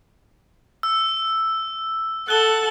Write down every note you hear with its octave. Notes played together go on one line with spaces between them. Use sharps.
E6
A4 F#5 A5 F#6 G7